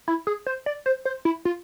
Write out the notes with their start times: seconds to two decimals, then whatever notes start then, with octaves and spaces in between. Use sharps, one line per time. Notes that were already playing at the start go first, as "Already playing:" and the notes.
0.08 E4
0.27 G#4
0.47 C5
0.66 D5
0.86 C5
1.05 C5
1.25 E4
1.45 F4